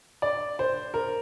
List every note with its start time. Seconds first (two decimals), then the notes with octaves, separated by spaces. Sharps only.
0.22 D5
0.59 C5
0.94 A#4